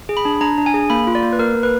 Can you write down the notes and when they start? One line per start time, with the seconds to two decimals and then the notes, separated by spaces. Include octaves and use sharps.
0.09 G#4
0.17 B5
0.25 D4
0.41 D4 A#5
0.58 D4
0.66 G#5
0.74 G#4
0.90 A#3 B5
1.07 F4
1.15 D5
1.22 A#3
1.33 B4
1.39 A#3 A#4
1.55 A#3
1.63 B4